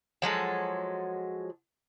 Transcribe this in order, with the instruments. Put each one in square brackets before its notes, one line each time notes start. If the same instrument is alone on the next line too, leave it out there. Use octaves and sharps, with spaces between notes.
[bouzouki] F3 F#3 G#3 A4